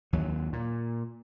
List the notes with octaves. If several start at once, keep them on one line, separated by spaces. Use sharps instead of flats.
D#2 F#3
A#2